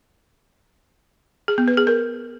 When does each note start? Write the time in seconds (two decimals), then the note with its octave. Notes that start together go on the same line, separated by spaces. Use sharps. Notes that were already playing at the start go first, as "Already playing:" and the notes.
1.48 G#4
1.58 B3
1.68 B4
1.77 G#4
1.87 A#4